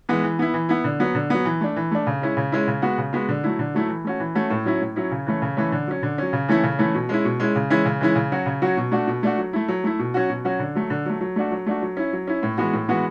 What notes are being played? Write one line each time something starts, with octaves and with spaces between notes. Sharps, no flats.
E3 G#3 B3
E3
B3 E4
E3
B3 E4
D3
F#3 B3
D3
F#3 B3
E3
A3 D4
E3
A3 D4
C#3
G#3 C#4 E4
C#3
G#3 C#4 E4
C#3
G#3 B3 F#4
C#3
G#3 B3 F#4
D3
F#3 A3 E4
D3
F#3 A3 E4
E3
A3 C#4 F#4
E3
A3 C#4 F#4
A2
F#3 C#4 E4
A2
F#3 C#4 E4
C#3
E3 A3 C#4
C#3
E3 A3 C#4
D3
F#3 C#4
D3
F#3 C#4
C#3
E3 A3 C#4 E4
C#3
E3 A3 C#4 E4
B2
G#3 C#4 E4
B2
G#3 C#4 E4
C#3
E3 G#3 C#4 E4
C#3
E3 G#3 C#4 E4
C#3
F#3 C#4 F#4
C#3
F#3 C#4 F#4
B2
A3 D4 F#4
B2
A3 D4 F#4
F#3
A3 E4
F#3
A3 E4
B2
F#3 C#4 F#4
B2
F#3 C#4 F#4
D3
F#3 A3
D3
F#3 A3
F#3
A3 D4 F#4
F#3
A3 D4 F#4
F#3
C#4 E4
F#3
C#4 E4
A2
E3 G#3 B3 F#4
A2
E3 G#3 B3 F#4